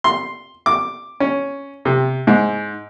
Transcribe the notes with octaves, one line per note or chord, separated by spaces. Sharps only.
C6
D6
C#4
C3
G#2